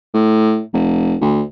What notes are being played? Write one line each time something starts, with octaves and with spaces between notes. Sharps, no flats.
A2
F1
D2